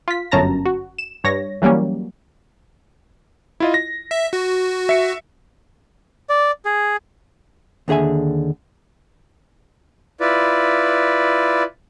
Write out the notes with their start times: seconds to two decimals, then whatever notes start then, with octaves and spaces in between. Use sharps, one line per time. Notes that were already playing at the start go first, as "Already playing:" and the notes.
0.08 F4 B6
0.31 G1 F#2 C#4 A5 A#5 A#6
0.65 F#4
0.98 E7
1.24 G2 C#5 A#6
1.62 E3 F#3 G3 A#3 C#4
3.60 E4 F4 D#5
3.74 A#6
4.11 E5
4.33 F#4
4.89 E5 C#7
6.30 D5
6.65 G#4
7.88 D#2 D3 G#4 E5 G#5
10.20 E4 F4 B4 D5